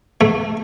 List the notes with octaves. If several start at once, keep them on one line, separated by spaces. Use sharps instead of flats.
A3